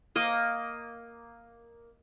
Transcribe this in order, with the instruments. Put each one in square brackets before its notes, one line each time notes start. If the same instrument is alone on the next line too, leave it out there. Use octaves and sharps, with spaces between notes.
[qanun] A#3 D#5